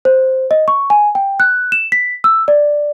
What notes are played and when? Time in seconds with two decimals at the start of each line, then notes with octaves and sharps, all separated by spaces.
0.05 C5
0.51 D#5
0.68 C#6
0.90 G#5
1.15 G5
1.40 F#6
1.72 E7
1.92 B6
2.24 E6
2.48 D5